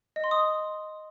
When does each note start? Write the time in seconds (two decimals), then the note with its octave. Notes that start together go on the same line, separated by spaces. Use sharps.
0.16 D#5
0.24 C6
0.31 D#6